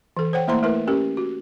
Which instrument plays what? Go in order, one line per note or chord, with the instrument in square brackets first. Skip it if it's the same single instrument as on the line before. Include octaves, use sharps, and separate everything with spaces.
[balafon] E3 A4
C5 C#5 F#5 G5
A3 A#3 E4 C5 A#5 C6
A3 E4 A#4 B4
C#4 G4 A#4
F#4